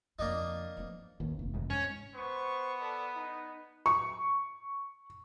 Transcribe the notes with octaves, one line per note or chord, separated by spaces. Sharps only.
F2 C#3 A#3 D4 D#4
F3 B3
A1 D#2
F1
G1 E2 G#2
G#2 C#4
B3 C5 C#6
A4 D5 A5
D#4
C#6